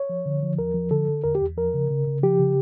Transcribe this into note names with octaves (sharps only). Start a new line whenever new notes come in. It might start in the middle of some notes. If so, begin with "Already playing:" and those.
Already playing: C#5
F3
D3
F3
E2 A#4
F3
D3 A4
D3
E2 A#4
G4
E2
F3 A#4
C#3
C#3
C#3
F3 G4
C#3